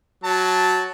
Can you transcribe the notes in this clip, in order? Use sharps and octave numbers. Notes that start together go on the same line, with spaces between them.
F#3 A5